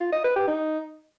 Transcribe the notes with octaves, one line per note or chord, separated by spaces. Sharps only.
F4
D#5
B4
G4
D#4